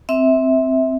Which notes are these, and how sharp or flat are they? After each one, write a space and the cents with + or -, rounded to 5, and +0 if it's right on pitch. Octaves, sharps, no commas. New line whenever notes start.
C4 +0 E5 -20